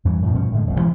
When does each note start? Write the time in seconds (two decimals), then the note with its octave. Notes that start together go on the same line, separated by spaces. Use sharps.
0.05 E2 G2 E3
0.22 F#2 A2
0.34 G2 B2 F3 C#4
0.52 A2 D3 G#3
0.67 F1 C2 A#2
0.80 C3 E3 G#3 B3